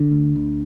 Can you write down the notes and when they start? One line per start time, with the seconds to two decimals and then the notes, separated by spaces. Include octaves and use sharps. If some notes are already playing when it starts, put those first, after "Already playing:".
Already playing: D3
0.11 D2
0.36 D2